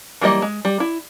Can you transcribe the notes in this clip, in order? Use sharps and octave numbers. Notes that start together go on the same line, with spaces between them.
E3 F#3 G3 A#3 D#5
G#3
G3
E4